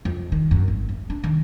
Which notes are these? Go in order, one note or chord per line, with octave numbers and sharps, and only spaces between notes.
F2
D#3
F#2
G#1
A3
D4
D#3